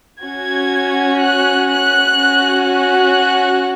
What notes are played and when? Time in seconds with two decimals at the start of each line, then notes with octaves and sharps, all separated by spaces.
0.22 C#4 F#4 G#6
1.19 F#6
1.67 F#6
2.15 C#4 F#4
2.64 F#6